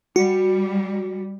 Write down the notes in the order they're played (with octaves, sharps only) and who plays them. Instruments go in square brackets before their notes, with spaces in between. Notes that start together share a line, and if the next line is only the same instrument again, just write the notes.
[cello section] G3 [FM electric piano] F#4